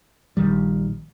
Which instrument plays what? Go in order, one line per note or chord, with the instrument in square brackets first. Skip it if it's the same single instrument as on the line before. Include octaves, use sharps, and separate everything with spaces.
[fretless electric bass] A#1 D#3 G3